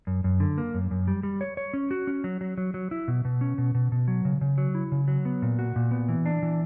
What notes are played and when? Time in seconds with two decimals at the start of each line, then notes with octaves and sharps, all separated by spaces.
0.07 F#2
0.24 F#2
0.40 D3
0.58 A#3
0.74 F#2
0.91 F#2
1.08 G3
1.23 G3
1.41 C#5
1.57 C#5
1.74 C#4
1.91 F#4
2.07 C#4
2.24 F#3
2.41 F#3
2.58 F#3
2.74 F#3
2.91 E4
3.08 B2
3.25 B2
3.41 C#4
3.58 B2
3.75 B2
3.92 B2
4.08 F#3
4.25 C#3
4.41 C#3
4.58 F#3
4.75 E4
4.92 C#3
5.08 F#3
5.25 B3
5.42 A#2
5.59 F#4
5.76 A#2
5.91 B3
6.09 E3
6.26 D4
6.43 E3